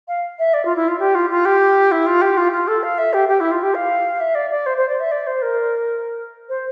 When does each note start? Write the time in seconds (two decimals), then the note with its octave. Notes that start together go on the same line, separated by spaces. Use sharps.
0.08 F5
0.39 E5
0.54 D5
0.65 F4
0.76 E4
0.88 F4
0.99 G4
1.15 F4
1.30 F4
1.45 G4
1.91 E4
2.06 F4
2.21 G4
2.37 F4
2.52 F4
2.67 A4
2.83 F5
2.98 E5
3.13 G4
3.28 G4
3.40 E4
3.51 F4
3.63 G4
3.75 F5
4.20 E5
4.35 D5
4.50 D5
4.66 C5
4.77 C5
4.89 D5
5.00 E5
5.11 D5
5.27 C5
5.42 A#4
6.49 C5